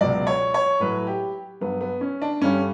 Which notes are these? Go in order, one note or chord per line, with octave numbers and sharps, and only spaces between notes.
C#2 B2 F#3 D5
C#5
C#5
A2 F#3 B4
G4
G2 F#3 B3
B3
C#4
D4
G2 D3 G3 C#4